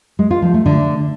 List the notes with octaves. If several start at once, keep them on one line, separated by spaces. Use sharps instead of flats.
G#3
F4
F3
A3
D3